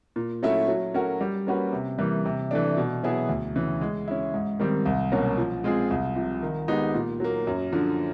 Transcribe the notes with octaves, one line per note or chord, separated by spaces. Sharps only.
A#2
F#3 A3 C#4 E4
F#3
A3 C#4 F#4 A#4
G3
A#3 C#4 F#4 B4
C3
E3 G3 A#3
C3
E3 A3 D4
B2
F#3 B3 E4 G#4
D2
C#3 E3
G#3
C#4 E4
G#2
D#3 G3 C4
C2
B2 F#3 A#3 C#4
F3
G#3 C4 F4 G#4
C2
C3 F3
D#3
G#3 B3 D#4 G4
A#2
F#3 A#3
F#2
D3 F3